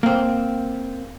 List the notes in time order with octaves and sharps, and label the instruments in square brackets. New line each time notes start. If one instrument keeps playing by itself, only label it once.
[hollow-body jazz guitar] A#3 C4